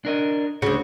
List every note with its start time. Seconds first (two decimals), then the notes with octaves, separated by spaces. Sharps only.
0.05 D4 A#4 D#5
0.62 D2 C#3 F#4